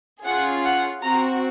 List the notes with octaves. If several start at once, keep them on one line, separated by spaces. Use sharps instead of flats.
C#4 F4 G#4 F#5
F#5
C4 F#4 A#5